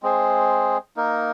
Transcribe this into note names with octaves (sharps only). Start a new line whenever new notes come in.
G#3 C4 G#4 C5
A#3 D#4 A#4